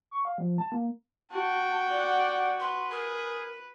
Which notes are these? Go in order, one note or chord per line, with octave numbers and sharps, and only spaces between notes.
C#6
F5
F3
A5
A#3
F#4 G5 A5
D5 F#5
B4 C6
G#4 A#4